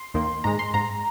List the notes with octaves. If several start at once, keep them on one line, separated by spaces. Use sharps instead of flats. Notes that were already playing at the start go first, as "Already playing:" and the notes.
Already playing: C6
D#2 D#3 A#3
G#2 G#3 A#5
C6
G#2 G#3 A#5